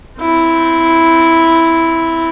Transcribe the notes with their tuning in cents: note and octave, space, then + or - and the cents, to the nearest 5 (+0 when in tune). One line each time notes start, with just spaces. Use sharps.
C4 -15 E4 +0